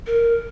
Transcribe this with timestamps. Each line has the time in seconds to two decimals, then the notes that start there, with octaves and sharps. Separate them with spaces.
0.07 A#4